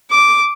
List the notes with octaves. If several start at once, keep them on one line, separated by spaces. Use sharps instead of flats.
D6